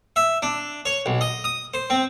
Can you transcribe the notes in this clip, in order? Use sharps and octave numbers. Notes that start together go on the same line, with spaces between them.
E5
D4
C#5
B1
D#5
D#6
C5
C4